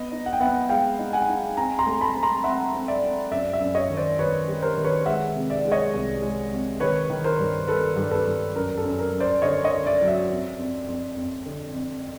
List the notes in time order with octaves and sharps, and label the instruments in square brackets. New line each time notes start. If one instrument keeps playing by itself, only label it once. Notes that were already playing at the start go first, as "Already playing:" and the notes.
Already playing: [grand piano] B3 D#5
D#4
F#5
G5
B3 E5 F#5
G#3 F5 G5
D#4
F#5 G#5
D#4
C4 G#5 A#5
A#5 C6
A3
A5 B5
C4
A#5 C6
C4 E5 F#5
C4
D5 E5
C4
F#2 D5 E5
D5 E5
F#2
C#5 D#5
D#3
C5 D5
D#3 B4 C#5
G3
A#4 C5
D#3
B4 C#5
G#3 E5 F#5
C3
D5 E5
G#3
C#5 D#5
C2
G#3
C3
D#3 B4 C#5
D#3
A#4 C5
G2
D#3 A4 B4
G2
A4 B4
G2
F#2 A#4
A4
F#2
A#4
F#2
C5 D5
D3 C#5 D#5
C#5 D#5
D3
D5 E5
F#3
D5 E5
F2
F2
F2
F2
D3
F2